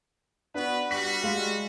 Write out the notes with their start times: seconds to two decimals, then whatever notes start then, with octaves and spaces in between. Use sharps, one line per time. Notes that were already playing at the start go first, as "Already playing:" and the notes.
0.54 B3 D4 F#4 B4
0.91 G3 F#4 B6
1.22 G#3 F5